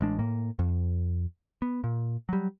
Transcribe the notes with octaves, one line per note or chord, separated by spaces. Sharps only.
A1 G#3 D4
A2 A#3
F2
B3
A#2
F#3 G3